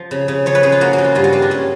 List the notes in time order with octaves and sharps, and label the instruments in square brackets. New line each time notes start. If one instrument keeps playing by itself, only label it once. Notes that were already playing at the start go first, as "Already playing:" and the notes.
Already playing: [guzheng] F3
C#3
C#3
F3 C#5
B4
C#3 G#4
F4
A#3 F#4
F#4
C#3
F4
G2 F4
F#4
G3 F4
D4
C#4